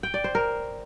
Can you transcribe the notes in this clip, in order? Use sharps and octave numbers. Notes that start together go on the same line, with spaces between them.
G5
D5
C5
A#4